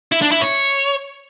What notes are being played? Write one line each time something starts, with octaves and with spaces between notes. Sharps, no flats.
E4
D4
E4
C#5